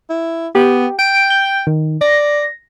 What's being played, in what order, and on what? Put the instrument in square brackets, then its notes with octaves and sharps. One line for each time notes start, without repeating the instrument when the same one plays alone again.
[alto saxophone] E4
[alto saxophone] B3 [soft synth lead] G4
[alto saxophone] G5 [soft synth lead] D7
[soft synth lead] G6
D#3
[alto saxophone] D5 [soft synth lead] A#6